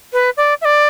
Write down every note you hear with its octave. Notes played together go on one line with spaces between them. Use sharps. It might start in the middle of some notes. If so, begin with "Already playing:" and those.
B4
D5
E5
D5